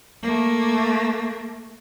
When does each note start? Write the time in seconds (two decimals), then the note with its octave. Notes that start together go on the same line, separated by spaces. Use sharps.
0.23 A3 A#3